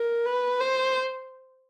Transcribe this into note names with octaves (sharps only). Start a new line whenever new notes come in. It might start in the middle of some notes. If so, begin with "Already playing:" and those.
Already playing: A#4
B4
C5